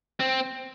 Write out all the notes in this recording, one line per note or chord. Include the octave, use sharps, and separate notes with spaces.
C4